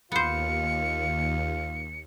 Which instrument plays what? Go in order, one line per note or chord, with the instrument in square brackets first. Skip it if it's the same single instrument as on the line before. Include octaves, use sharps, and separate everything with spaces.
[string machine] D#2 [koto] B3 C5 [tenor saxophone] F4 [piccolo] C#7